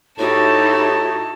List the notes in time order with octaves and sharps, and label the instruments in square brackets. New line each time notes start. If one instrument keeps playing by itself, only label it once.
[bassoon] A2 [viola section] D#4 E4 G4 [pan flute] F#4 [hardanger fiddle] A5